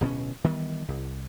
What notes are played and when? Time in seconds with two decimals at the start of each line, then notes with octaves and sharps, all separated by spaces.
0.01 D1 B2 C4 C#4
0.44 D#3 E3 G3 B3
0.88 C2